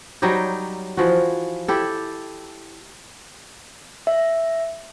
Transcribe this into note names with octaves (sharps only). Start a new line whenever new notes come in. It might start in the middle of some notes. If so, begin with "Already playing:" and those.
F#3 G3 D#4 G4
E3 F3 F#4
E4 G4 A4
E5